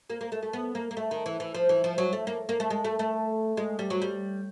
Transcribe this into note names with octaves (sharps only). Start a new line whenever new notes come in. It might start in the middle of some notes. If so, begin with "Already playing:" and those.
A#3
A#3
A3
A3
B3
A#3
A#3
A3
D#3
E3
E3
F3
E3
F3
F#3
A3
A#3
A#3
A3
G#3
A3
A3
G#3
G3
F#3
G3